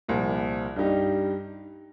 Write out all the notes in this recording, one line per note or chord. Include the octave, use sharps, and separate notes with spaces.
C2 A#2 F3
G2 G3 D#4 G4